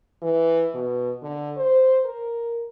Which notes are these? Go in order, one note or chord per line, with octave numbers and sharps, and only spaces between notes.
E3
B2
D3
C5
A#4